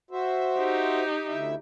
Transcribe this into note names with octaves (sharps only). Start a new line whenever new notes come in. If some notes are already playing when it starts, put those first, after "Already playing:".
F#4 C5 E5
D#4 G4
D2 E4 E5